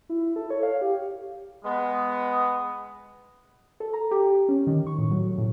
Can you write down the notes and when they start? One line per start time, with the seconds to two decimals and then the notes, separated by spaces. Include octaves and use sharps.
0.09 E4
0.36 A4
0.50 C#5
0.63 F5
0.81 G4
1.65 G#3 B3
3.80 A4
3.93 A#5
4.11 G4
4.49 C#4
4.67 D#3
4.87 C#6
4.98 A2
5.11 F#3
5.38 A2